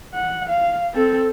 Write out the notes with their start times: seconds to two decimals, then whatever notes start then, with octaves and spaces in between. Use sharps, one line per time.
0.14 F#5
0.49 F5
0.93 C4 A4